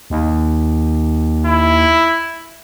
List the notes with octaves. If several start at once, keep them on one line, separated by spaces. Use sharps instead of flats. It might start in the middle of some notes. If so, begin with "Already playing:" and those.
D#2
E4